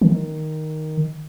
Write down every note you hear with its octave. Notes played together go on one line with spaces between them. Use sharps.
D#3